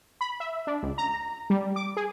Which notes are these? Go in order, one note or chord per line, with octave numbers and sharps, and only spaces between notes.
B5
E5
D4
C#2
A#5
G3
D6
G#4